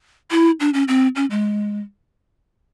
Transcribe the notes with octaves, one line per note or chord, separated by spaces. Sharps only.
E4
D4
C#4
C4
C#4
G#3